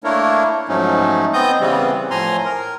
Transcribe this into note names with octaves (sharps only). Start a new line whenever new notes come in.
A3 A#3 D4 E4 A#4 C#5
G#2 F3 F#3 A3 C#4 D#4
B3 C4 D#5 D#6 G6
C#3 E3 G3 B3 C4
A2 F3 G#5 A#5 C6
A#4